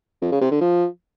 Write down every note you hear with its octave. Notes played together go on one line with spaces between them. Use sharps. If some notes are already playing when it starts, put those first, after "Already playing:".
F2
C#3
C3
D3
F3